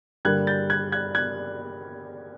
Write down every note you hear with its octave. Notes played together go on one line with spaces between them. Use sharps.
G2 D3 G3 A#3 F#6 G#6
G6 A6
F#6 G#6
F#6 G#6
F#6 G#6